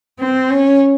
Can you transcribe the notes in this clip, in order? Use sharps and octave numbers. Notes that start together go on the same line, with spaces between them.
C4
C#4